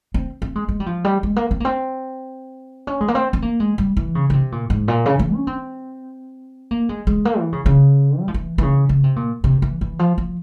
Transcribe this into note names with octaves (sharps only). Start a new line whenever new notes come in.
C4
C4
G#3
G#3
G3
F3
G3
G#3
A#3
C4
A#3
C4
C#4
G#3
A#3
C4
C4
A#3
G#3
G3
E3
C#3
C#3
C3
A#2
G#2
A#2
C#3
E3
C#4
C4
A#3
G#3
G#3
A#3
E3
C#3
C#3
G3
F3
E3
E3
C#3
C#3
C3
A#2
C3
E3
E3
F3
F3